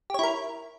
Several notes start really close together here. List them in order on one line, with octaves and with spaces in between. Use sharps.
G4 C#5 E4 A#4